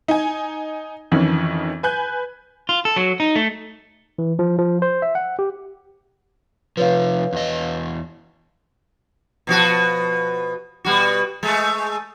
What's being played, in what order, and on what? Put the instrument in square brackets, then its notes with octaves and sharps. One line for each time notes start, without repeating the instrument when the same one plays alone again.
[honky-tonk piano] D#4 G#5
F2 D#3 E3 C#4
B4 G#5 F#6 G6
[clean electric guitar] F4
A4
F#3
D#4
A3
[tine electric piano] E3
F3
F3
C5
E5
F#5
G4
[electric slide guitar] C3 F3 [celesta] B4 C#5 F5
[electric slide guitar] E2 D#5
[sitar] B2 F3 F#4
B2 G3 F#4
G#3 A3